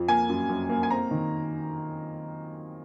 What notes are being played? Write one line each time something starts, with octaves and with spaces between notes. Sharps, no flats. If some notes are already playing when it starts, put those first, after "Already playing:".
Already playing: F2
A#3 G#5
F#2
F#2
A#3
G#5
C4 A#5
D#3